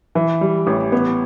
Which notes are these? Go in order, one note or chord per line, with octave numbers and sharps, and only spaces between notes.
E3
G3
A1
B3